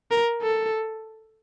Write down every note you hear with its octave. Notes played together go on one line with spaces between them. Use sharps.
A#4
A4